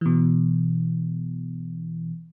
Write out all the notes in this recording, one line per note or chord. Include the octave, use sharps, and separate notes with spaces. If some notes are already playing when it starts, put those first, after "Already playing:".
B2 E3